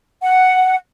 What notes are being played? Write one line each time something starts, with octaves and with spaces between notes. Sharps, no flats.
F#5